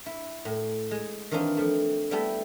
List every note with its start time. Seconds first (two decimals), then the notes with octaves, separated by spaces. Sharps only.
0.06 E4
0.45 A2
0.91 G#3
1.31 D#3 E3 C4 D4 D#4 F4
1.57 F3 A3
2.11 G3 A3 B3 E4 G4 A4